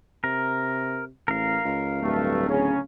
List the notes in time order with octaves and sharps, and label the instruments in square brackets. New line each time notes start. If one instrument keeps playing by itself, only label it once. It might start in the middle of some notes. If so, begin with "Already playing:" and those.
[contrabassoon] C3 [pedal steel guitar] A#4
[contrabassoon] A1 [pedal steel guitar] A#4 F5
[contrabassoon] C#2
[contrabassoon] D1 [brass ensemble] G2 A3
[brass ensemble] C#3 C#4